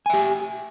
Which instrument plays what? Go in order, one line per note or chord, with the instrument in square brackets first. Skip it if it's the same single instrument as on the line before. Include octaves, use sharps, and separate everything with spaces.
[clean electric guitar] G#5
E5
G4